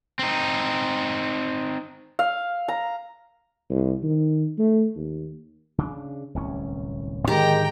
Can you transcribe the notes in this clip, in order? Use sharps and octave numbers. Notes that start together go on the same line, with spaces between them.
C4 D#4
F5
A#5
C2
D#3
A3
D#2
C#3 D4
D1 C2 C#4
G#2 D3 D#3 F3 G#3 G4 G5 A#5